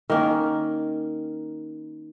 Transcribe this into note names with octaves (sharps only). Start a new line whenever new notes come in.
D#3 A#3 C#4